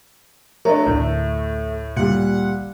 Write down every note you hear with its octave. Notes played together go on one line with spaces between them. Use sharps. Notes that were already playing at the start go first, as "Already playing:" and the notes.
F#3 A3 D4 A#4
A1 D2 A2
A#2 G3 F#5